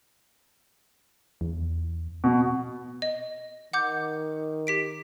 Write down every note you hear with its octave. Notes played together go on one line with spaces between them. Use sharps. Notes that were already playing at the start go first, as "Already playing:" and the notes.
E2
B2
D#5
D#3 F#5 D6 G6
G4 B6 D7